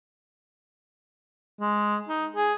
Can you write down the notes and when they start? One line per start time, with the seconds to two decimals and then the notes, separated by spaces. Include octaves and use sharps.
1.60 G#3
2.09 D#4
2.37 G#4